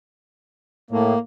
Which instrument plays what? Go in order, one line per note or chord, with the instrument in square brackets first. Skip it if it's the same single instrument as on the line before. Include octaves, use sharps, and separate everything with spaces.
[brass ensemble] A2 [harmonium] A#3